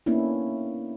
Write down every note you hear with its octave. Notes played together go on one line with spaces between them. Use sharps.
A#3 B3 C#4 D4 E4